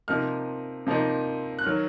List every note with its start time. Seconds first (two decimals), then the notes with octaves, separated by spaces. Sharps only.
0.08 C3 F3 A#3 D#4 F6
0.87 C3 F3 A#3 D#4
1.59 F#6
1.64 D#3 F#3 F6